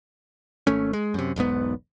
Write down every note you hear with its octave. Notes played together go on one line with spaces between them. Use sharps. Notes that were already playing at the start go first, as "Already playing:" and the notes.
G#1 A3 C#4
G#3
F#2 C3
E1 B1 G#2 B3